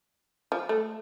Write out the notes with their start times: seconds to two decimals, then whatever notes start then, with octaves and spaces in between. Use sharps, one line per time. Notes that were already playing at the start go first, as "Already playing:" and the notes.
0.52 F3
0.69 A3